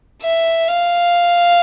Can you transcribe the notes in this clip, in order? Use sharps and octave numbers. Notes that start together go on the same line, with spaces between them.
E5
F5